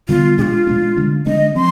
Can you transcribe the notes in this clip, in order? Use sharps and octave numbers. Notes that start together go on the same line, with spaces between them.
D3 G3 B3 F4
B2 G#3 D4 F4 G#4
B2 G#3 D4
D3 G#3 D4
D3 G#3 D4 D#5
F3 C4 C6